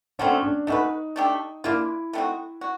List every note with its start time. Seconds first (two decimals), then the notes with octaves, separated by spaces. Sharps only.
0.19 D3 F#3 A3 C4 C#4
0.43 D4
0.67 A3 C#4 D#4 F#4 B4
1.16 A3 D4 G4
1.64 A#3 D4 E4 F4
2.13 A3 C4 D#4 F#4
2.61 F#4